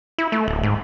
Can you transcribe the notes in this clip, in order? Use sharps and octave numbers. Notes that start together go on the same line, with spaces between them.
E4
A3
D1
G#2